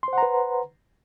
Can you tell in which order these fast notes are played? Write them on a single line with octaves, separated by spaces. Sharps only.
C6 C5 F#5 A#5 B4